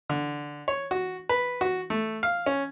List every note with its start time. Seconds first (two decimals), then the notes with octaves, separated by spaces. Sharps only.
0.10 D3
0.68 C#5
0.91 F#4
1.29 B4
1.61 F#4
1.90 A3
2.23 F5
2.46 C#4